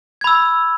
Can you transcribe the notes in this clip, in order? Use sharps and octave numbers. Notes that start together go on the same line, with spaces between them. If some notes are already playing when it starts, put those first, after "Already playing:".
B5 E6 G#6